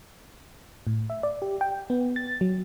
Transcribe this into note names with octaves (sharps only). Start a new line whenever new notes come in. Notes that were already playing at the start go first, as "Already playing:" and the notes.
A2
E5
D5
G4
G5
B3
A6
F#3